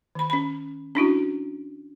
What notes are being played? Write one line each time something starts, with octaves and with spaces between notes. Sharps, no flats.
D#3 B5
C#4 B5
C#4 D4 E4 F#4